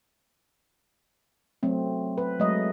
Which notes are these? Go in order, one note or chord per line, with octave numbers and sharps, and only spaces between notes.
F#3 A3 C4
B4
F#3 G#3 A3 D#5